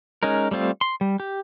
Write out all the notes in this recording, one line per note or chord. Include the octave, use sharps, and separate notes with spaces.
G#3 C#4 D#4 A#4
G3 A3 C4 F4
C6
G3
G4